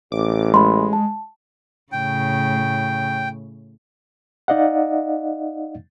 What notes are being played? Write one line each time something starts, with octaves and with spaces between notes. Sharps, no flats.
A1 D6
G#3 B5 C6
A5
A2 C#3 G5
D#4 D5 D#5 F5 F#5